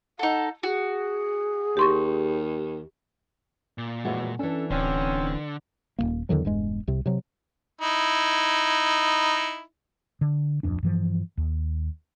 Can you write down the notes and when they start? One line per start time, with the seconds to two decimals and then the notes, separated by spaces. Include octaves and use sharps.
0.19 D#4 A4 F#5
0.63 F#4 G#4
1.77 D#2 G4 C6 C#6
3.78 A#2
4.04 F2 A2 E3 G#3 F#4
4.39 E3 C#4 D4 A4
4.70 D1 D3 C4 C#4
5.99 D#1 C#2 A#3
6.29 E2 D3 D#3 F#3
6.45 E1 G2 G#3
6.87 C2 C3
7.06 C3 F#3
7.81 D#4 E4
10.21 D3
10.63 D1 F2 D4
10.83 G2 E3 F3
11.37 D#2